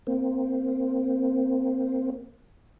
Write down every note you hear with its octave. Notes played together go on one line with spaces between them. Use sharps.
A#3 C4